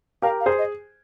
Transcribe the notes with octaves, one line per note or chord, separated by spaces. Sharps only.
G4 A#4 F5
F5
G#4 C5
D#5